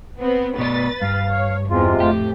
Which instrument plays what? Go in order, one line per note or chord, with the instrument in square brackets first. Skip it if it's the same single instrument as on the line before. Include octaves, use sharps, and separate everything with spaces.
[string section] B3 C4
[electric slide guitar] B2 D5 [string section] B4 A6
[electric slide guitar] G2 [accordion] F5
[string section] C#5
[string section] E2 [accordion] C3 G#3 F4
[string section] F2 A2 [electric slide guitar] G4